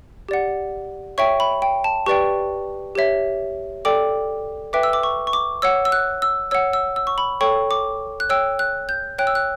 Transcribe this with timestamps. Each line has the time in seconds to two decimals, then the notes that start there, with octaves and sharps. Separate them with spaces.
0.29 G4 D5 F#5
1.18 C#5 E5 G5 C#6
1.40 B5
1.62 G5
1.84 A5
2.06 G4 B4 D5 G5 C#6
2.95 G4 C#5 E5
3.85 A4 D5 G5 D6
4.73 B4 E5 G5 D6
4.83 E6
4.93 D6
5.03 C#6
5.27 C#6
5.33 D6
5.62 C#5 F#5 E6
5.85 E6
5.92 F#6
6.22 E6
6.51 C#5 F#5 E6
6.73 E6
6.96 E6
7.07 C#6
7.18 B5
7.41 A4 C#5 G5 C#6
7.71 D6
8.20 F#6
8.30 C#5 G5 E6
8.59 F#6
8.89 G6
9.18 C#5 G5 F#6
9.27 E6
9.35 F#6